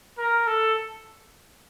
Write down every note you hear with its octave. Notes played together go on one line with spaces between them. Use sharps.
A#4
A4